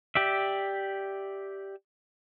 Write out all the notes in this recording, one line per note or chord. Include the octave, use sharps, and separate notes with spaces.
G4 D5 E5